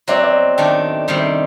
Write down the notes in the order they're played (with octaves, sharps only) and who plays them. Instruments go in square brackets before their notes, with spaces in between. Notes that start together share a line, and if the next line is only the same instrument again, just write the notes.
[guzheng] F#3 C4 F#4 [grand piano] D5
[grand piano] D5
D#5
[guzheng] D#3 A3 D4 [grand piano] G5
[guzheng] C3 D#3 G3